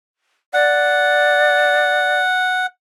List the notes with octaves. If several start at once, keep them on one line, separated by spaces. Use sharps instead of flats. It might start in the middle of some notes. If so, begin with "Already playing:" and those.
D5 F#5